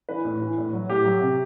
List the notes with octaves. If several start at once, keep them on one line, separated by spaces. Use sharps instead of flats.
E3 B4
A2
E3
A2
F#3
A2 G4
F#3
C3